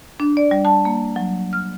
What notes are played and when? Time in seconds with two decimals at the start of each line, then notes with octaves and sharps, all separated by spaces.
0.20 D4
0.37 D5
0.51 G3
0.65 A5
0.85 A#3
1.16 F#3
1.53 F6